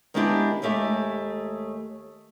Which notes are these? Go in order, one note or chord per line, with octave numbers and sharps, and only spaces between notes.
D#3 G#3 B3 D4 E4 G4
D#2 G#3 A3 G4 E5